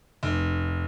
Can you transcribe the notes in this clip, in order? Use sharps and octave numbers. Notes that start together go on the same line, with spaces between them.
F1